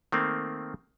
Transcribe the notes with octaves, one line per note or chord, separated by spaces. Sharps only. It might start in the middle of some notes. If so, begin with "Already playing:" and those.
D#3 A3 A#3 C4